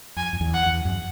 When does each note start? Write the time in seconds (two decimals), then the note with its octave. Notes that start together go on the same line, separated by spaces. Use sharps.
0.16 F2 G#5
0.33 F2
0.41 E2
0.54 F#5
0.66 E2
0.85 F#2